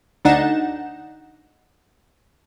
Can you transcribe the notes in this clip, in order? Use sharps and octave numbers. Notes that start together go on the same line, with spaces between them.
D2 D4 D#4 F#5 E7